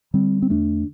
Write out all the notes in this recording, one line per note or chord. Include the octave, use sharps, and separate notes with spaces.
D3 G3 C4
C4
E2 A3 D4